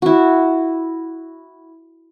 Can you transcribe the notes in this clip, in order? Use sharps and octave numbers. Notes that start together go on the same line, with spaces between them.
E4 F#4